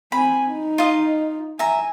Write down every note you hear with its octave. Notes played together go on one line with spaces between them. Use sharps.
C4 G#5 B5
D#4
F4 D#5
E5 G#5 A#5